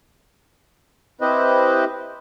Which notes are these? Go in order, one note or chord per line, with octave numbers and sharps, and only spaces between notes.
C4 E4 G4 B4 C5 D#5